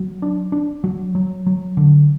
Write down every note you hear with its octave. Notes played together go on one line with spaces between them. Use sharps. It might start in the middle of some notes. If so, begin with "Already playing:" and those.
Already playing: F#3
D4
D4
F#3
F#3
F#3
D3